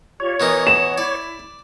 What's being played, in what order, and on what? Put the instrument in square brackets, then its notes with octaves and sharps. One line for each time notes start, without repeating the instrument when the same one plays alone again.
[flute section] F4 G4 D5 [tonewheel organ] C#5
[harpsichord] B2 E3 D#4 [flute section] A#4 B4
[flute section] F#5 [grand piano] E7
[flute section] E4 [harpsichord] D5